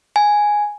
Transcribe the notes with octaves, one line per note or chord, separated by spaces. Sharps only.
G#5